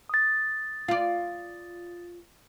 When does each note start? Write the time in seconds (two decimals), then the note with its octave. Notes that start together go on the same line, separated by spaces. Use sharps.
0.09 D#6 A6
0.88 F4 D5